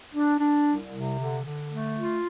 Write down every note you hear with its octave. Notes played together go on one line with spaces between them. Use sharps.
D4
D4
C2
C3
D3
D3
A3
F4